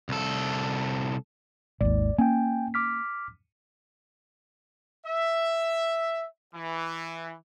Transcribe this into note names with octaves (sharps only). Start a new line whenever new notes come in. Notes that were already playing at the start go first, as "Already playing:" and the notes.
C2 A4
G#1 D#2 D5
A#3 C#4 G5 G#5
D6 F6 B6
E5
E3